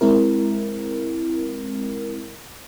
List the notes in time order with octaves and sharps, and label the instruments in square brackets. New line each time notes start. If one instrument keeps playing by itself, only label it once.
[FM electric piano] G#3 C4 E4 A#4